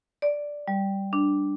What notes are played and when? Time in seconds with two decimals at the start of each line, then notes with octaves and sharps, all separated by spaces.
0.22 D5
0.68 G3
1.13 D4